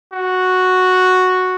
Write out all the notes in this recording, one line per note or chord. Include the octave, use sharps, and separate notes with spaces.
F#4